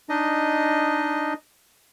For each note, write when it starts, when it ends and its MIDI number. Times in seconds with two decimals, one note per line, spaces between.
0.09 1.33 62
0.09 1.33 63
0.09 1.33 75